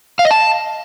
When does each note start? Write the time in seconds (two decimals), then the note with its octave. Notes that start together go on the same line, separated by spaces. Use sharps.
0.19 F5
0.25 D#5
0.31 A5